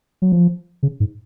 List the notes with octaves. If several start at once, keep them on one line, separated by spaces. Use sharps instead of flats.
F#3
F3
C#3
G#2